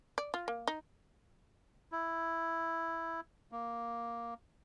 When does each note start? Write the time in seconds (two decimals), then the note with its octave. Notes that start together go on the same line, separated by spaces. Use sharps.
0.18 D5
0.34 F4
0.48 A#3
0.67 D#4
1.92 E4
3.52 A#3